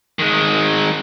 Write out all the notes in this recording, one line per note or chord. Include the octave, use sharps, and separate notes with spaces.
D#3 G#3